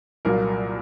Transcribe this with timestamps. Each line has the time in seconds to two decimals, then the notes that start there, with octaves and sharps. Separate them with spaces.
0.25 C2 A#2 F#3 A#3 A#4